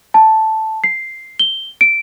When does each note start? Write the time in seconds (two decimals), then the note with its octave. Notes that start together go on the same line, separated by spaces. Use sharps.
0.14 A5
0.84 C7
1.39 G7
1.81 D7